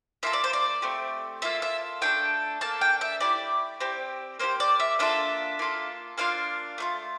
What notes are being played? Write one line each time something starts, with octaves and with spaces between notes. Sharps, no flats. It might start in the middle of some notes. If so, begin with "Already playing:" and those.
A#3 F4 A4 E5
D5
C5
D5
A3 C4 G4
A#3 F4 A4 E5
E5
A3 D4 A4 G5
A#3 D4 A4 A5
G5
E5
A3 E4 G4 D5
C4 G4
A#3 D4 G4 C5
D5
E5
A#3 D4 F4 A4 E5
A#3 F4 A4
A#3 D4 F4 F5
A3 D4 F4